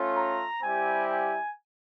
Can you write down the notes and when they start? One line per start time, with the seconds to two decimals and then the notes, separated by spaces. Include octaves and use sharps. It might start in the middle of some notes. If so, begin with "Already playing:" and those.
Already playing: A3 C#4 F4
0.17 A#5
0.63 G3 C4 E4 G4 G#5
1.11 G#5